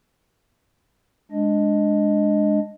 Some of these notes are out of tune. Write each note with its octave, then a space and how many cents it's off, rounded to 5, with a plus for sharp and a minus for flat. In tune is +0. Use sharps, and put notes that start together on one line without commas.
G#3 +0 D4 +0 D#5 +0